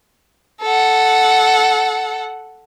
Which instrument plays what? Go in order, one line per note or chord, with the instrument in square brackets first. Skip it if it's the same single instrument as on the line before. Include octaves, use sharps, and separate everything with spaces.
[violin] A4 F#5